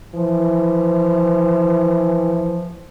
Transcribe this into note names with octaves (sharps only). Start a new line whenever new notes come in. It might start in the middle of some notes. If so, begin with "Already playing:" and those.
E3 F3